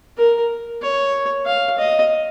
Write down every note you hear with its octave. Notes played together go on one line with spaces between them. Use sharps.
A#4
C#5
F5
D#5